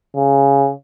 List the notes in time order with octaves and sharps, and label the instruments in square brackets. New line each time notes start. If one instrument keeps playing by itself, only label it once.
[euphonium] C#3